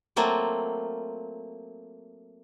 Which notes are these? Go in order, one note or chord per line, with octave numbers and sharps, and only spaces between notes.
F#3 A3 A#3 C4 F4